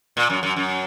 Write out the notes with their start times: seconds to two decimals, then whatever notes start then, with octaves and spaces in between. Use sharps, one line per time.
0.17 A#2
0.30 F#2
0.43 F#2
0.56 F#2